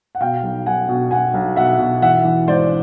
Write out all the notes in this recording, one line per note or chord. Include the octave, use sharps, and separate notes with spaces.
F#5
B2 F5 G5
B1
B1 F#5 G#5
B2
B2 F#5 G#5
B1
B2 E5 F#5
B2
E3 E5 F#5
E3
G#1 C5 D5